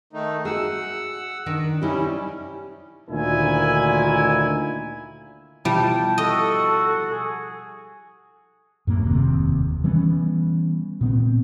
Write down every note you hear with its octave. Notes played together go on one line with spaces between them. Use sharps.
D#3 A3 D#4
F#4 G#4 F#5 E6
D#3 D4
C3 G3 C#4 D#4 E4 G4
D2 A#2 D#3 E4 G#5
B2 F3 G3 E4 G5 A5
F#4 A4 D#5
G#4
F#2 A2 A#3
F1 D#2 C3
E3 G3 B3 C#4
A#2 B3 C4